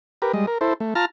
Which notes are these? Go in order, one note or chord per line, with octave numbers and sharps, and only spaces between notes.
G4 A#4 B4
G3 G#3 D#5
A#4
E4 A4 C5
A3
F4 A5 A#5 F6